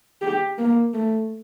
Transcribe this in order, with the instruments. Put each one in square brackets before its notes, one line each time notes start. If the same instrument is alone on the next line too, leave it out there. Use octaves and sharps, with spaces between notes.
[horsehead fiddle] G4
A#3
A3